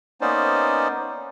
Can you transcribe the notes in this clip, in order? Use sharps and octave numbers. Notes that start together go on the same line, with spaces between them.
A#3 B3 C#4 D#4 C5 D5